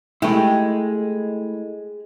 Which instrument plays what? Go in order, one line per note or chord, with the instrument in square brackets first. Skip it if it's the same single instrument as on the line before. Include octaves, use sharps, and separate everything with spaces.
[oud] G#3 G4 [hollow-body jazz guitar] A3 E4